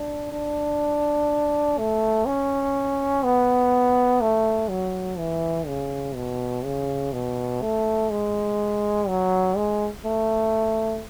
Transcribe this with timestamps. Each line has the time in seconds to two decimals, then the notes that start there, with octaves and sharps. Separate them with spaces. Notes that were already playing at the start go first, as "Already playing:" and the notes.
Already playing: D4
0.32 D4
1.78 A3
2.26 C#4
3.24 B3
4.21 A3
4.69 F#3
5.18 E3
5.67 C#3
6.15 B2
6.64 C#3
7.12 B2
7.61 A3
8.10 G#3
9.08 F#3
9.56 G#3
10.04 A3